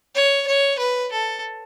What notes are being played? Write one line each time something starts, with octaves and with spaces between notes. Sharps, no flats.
C#5
C#5
B4
A4